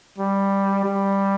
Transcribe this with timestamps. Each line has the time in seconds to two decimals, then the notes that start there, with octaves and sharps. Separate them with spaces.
0.18 G3
0.84 G3